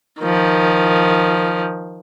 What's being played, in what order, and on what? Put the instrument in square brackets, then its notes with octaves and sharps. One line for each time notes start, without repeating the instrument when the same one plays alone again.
[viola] D#3 F3